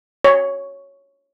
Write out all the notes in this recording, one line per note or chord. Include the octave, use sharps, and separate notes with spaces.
C#5